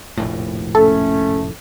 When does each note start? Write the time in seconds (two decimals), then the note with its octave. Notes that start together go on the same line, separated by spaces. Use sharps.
0.17 F1 A#1 A2
0.75 A3 C#4 A4